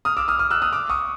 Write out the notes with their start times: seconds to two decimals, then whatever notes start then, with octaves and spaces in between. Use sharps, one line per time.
0.05 D#6 F6
0.17 D6 E6
0.28 D#6 F6
0.39 D#6 F6
0.51 E6 F#6
0.62 D#6 F6
0.73 D6 E6
0.89 C#6 D#6